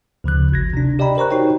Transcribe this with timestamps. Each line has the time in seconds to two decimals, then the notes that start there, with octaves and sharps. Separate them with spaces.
0.24 D2 C#3 F3 F#6
0.52 G#1 G#6 A#6
0.73 C3 D4
0.99 G4 D5 D#5 G5 A#5 B5
1.17 A#4 C5 A#5 C#6 F#6
1.30 D#4 F#4 G4 C5 C#5 G5